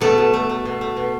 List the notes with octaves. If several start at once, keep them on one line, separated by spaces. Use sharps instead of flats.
B2 A3 A4
B2
A3
A3
B2
A3
B2